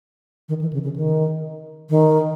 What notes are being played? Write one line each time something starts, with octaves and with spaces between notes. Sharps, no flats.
D#3
E3
C#3
C#3
D#3
D#3